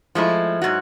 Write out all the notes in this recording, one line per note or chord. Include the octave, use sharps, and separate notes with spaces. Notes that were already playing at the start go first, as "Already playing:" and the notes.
F3 G#3 A3 E4
G#2 B2 F#3 F#4